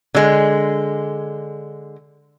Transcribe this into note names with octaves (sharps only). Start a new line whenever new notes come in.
D3 G#3